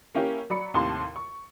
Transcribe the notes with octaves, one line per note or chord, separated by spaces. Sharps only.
A#3 C#4 E4 G4 A#4
F#3 D5 B5 C#7
D#2 A2 C3 A5 C6
C#6